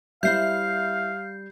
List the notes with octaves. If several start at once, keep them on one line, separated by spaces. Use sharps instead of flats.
G3 E4 C5 E5 F5 G6 C7